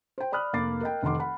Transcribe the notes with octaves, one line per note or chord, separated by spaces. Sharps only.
C5 G5
D5 B5 D#6 F6 F#6
F1 A#3 B5 D6 A6 C7
A#4 D#5 G5
F1 D#3 F#5 C6 D6
F#5 B5